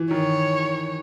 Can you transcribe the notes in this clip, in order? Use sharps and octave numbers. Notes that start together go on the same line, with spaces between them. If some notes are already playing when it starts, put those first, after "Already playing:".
Already playing: E3
D#3 C#5